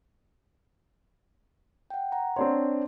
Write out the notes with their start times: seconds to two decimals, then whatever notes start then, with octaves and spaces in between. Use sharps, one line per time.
1.90 F#5 G5
2.12 F#5 A#5
2.36 C4 D4 C#5 C6